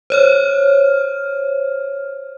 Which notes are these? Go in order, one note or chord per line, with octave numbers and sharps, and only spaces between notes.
C5 C#5 F6